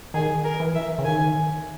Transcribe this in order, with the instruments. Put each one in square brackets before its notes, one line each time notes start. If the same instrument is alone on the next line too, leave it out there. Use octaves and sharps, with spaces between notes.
[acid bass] D#3 [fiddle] G#4
[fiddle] A#4
[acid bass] E3
[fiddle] E5
[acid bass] C#3
[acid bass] D#3 [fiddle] G#5